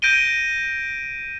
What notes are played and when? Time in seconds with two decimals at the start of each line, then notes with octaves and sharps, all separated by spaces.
0.02 G6 A#6 D7 D#7 G7